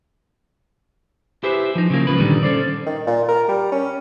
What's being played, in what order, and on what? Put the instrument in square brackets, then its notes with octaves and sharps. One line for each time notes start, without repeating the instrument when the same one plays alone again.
[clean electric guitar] E4 G4 G#4 B4 C5
F3 D#4
C#3 F#3 A#3
C#2 C#3 F3 B4
G2 A#2 D3 D#3 G3
C#4 A4 C5 D5
[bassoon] D#3
A#2
A#4
G3
C#4